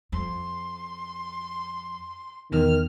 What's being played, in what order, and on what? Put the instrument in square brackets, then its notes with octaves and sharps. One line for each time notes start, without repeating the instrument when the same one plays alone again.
[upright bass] F2 [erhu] C6
[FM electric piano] E2 B2 [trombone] D#3 [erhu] F6